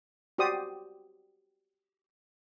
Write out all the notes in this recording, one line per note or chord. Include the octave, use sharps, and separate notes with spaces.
F#4 G4 C5 D5 D#6